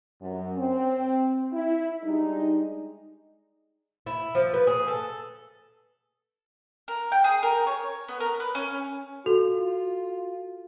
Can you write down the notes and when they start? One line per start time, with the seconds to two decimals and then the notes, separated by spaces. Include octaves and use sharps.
0.21 F#2
0.58 C4
1.52 E4
2.02 G3 G#3 D4 D#4
4.07 E4
4.35 F3
4.54 B4
4.67 G#4
4.88 A4
6.88 A#4
7.12 G5
7.24 G#4
7.43 A#4
7.67 C#5
8.08 B3
8.20 A#4
8.40 B4
8.55 C#4
9.26 F4 F#4 A4 F7